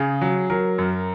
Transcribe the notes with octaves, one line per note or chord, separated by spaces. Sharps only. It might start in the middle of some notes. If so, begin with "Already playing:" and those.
Already playing: C#3 G#4
F#3
F#3 A#4
F#2